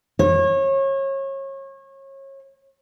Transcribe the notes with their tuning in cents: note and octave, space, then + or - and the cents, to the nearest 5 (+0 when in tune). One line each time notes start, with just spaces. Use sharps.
C#5 -30